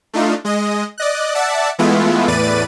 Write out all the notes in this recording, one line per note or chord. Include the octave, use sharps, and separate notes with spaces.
A3 D4 D#4 F4
G#3 D#5
D5 D#5 F#6
D5 E5 F#5 A5
E3 G#3 A3 B3 E4 F4
E2 A2 B4 D5 A6 D#7